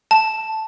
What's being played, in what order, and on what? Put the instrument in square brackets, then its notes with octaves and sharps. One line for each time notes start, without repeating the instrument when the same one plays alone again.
[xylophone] A5